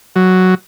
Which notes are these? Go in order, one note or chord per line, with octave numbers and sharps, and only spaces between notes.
F#3